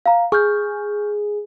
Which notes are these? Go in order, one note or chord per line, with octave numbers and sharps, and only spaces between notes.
F5 A#5
G#4 C#6 F6 G6